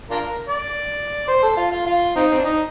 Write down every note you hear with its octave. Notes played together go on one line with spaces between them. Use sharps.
D4 F4 A#4
D5
C5
A4
F4
F4
F4
C4 D#4
C4
D4
D#4